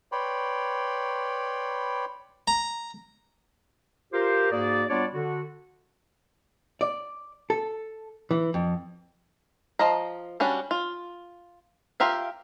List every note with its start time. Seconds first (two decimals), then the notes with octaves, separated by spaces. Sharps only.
0.12 B4 C#5 D5 G5 B5 C6
2.48 A#5
4.13 F4 G4 A#4 C5
4.52 G#2 A#3 F#4 G#4 D5
4.89 G3 B3 D4 F4 C#5 D5
5.14 D3 F#4
6.81 D5
7.50 A4
8.31 E3
8.54 F2
9.79 F3 D#5 F5 A#5
10.40 G3 C#4 D4 F#4
10.71 F4
12.00 F4 G4 A#4 E5 F5